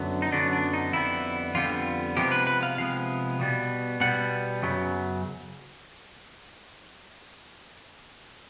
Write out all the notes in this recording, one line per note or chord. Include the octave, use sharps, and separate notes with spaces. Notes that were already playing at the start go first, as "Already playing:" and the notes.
Already playing: F#2 D3 F#3 B3
D#4
F#2 D3 F#3 B3 D4
D4
D#4
F2 D3 G3 B3 E4
F2 D3 G3 B3 F4
C3 F3 G#3 B3 G4
B4
B4
F5
C3 F3 G#3 B3 F5
B2 G3 B3
B2 G3 B3 F#5
F#2 C#3 F#3 B3